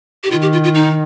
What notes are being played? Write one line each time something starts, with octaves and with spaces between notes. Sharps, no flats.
G4
D#3 F4
G4
F4
F4
D#4